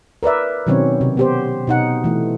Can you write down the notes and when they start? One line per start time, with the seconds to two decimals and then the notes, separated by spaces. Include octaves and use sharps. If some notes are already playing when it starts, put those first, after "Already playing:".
0.23 A#4 B4 D5 E5
0.67 B2 D#3 F#3 C4 C#4 C#5
1.01 C3
1.17 B3 G4 C5
1.67 B2 D#4 F#5
2.04 E3 A3